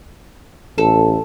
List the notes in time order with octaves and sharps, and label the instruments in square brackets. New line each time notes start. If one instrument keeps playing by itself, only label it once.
[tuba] A1 [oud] A4